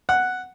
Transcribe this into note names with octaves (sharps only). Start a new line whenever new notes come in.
F#5